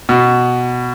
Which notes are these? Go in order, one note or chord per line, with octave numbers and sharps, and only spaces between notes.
B2